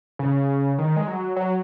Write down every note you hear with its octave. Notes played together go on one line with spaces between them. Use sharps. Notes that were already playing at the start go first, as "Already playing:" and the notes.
C#3
D#3
G#3
F#3
F#3